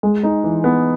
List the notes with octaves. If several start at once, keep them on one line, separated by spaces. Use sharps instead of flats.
G#3
D#4
E3
B3